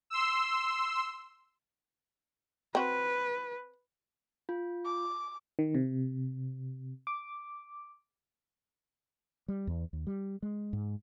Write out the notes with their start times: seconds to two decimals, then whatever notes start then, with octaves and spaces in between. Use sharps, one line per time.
0.10 C6 E6
2.75 C4 F#4 B4
4.49 F4
4.85 D6
5.59 D#3
5.75 C3
7.07 D6
9.48 G3
9.67 E2
9.93 D#2
10.07 G3
10.42 G#3
10.73 G#2